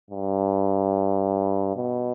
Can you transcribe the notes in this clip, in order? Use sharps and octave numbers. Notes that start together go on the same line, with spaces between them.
G2
B2